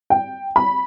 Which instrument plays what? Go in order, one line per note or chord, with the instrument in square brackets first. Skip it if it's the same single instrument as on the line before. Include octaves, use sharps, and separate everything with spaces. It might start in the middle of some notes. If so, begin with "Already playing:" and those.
[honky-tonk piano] G5
B5